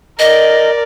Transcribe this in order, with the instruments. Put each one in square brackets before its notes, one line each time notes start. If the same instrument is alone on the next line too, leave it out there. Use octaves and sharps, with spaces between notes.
[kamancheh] A#4 D5 [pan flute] D#5